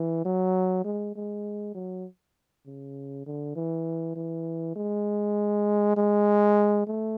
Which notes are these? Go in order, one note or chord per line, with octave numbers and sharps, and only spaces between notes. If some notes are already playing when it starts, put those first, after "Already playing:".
Already playing: E3
F#3
G#3
G#3
F#3
C#3
D3
E3
E3
G#3
G#3
A3